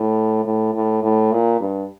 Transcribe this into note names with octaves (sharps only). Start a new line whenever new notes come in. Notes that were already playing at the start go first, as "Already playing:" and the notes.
Already playing: A2
A2
A2
A2
A#2
G2